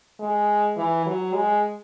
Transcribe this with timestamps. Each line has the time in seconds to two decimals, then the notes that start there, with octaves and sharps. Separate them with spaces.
0.19 G#3
0.77 E3
1.06 F#3
1.35 G#3